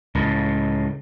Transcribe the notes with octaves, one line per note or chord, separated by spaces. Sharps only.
C#2 A2